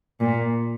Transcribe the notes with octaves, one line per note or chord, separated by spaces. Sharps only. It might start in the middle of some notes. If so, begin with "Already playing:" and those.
A#2